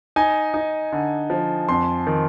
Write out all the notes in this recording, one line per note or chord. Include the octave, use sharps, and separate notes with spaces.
D#4 G#5
D#4
D3
F3
F2 C6
D#3